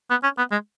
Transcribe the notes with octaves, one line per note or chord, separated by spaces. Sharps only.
B3
C#4
B3
G#3